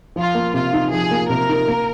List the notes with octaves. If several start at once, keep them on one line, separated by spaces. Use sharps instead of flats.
F3 F4
A#3
C3 F4
D#4
F3 G#4
A#3
C3 A#4
D#4
A#3